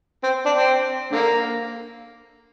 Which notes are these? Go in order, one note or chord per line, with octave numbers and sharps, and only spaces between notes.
C4
D4
C4
D3 A#3